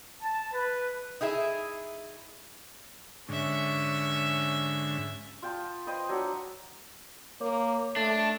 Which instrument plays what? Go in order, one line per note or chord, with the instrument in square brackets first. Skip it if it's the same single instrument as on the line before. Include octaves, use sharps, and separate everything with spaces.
[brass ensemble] A5
B4
[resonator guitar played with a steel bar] D#4 E4 G#4 E5
[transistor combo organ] G#2 D3 [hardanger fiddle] C#4 E5
[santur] F4 G5 A5 D#6
B4 C5 D#5 G5
F#3 D4 E5 F#5
[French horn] A#3 [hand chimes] C#5 D6
[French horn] A3 [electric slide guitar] D4 [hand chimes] A6